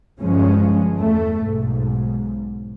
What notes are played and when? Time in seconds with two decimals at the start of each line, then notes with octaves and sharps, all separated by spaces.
0.20 G1 G2 F3 G#3 C#4
0.95 E2 A3
1.41 B1 G#2